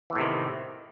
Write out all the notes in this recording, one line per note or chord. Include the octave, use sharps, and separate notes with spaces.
E2 A2 C3 D#3 E3